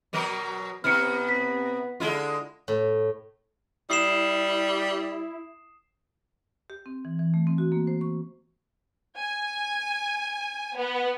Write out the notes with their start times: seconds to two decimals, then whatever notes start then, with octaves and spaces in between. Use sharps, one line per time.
0.13 B2 F#3 A#4
0.84 C3 B3 E4 F6 C#7
1.29 B6
2.00 D3 G#3 E4 F4
2.68 A2
3.90 G3 E4 D#6 C7 E7
6.70 G4
6.86 C4
7.05 E3
7.19 E3
7.34 A3
7.47 C4
7.58 F#4
7.72 A#3
7.87 C5
8.01 C#6
9.17 G#5
10.75 B3